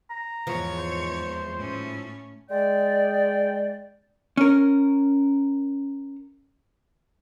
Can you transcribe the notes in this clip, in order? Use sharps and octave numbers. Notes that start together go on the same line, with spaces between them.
A#5
E2 G#2 E3 F3 C#5
C5
A2 C#4
G#3 D5 G5
C#4 A#4